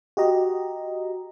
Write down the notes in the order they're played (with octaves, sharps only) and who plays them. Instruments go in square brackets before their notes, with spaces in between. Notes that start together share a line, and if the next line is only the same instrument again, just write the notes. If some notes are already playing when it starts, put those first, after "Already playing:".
[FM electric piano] F#4 G4 D#5 A#5